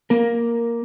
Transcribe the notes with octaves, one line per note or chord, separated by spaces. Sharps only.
A#3 A#4